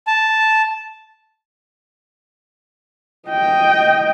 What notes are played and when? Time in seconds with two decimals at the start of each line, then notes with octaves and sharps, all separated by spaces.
0.07 A5
3.29 D#5 G5